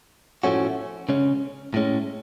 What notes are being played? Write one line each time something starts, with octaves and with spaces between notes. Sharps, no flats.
A2 F3 A3 C#4 F#4
C#3 G#3 C#4
A2 G#3 C#4